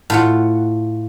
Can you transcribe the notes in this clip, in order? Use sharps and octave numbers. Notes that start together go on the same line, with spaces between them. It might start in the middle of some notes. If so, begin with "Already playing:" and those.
A2 F4 F#5